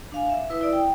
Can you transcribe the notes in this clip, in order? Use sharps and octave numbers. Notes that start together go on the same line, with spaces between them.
D4 F5 G#5
E5
E4 B4 E5 D#6
E4 D5
G5